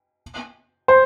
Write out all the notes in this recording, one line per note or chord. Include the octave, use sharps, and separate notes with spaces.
C5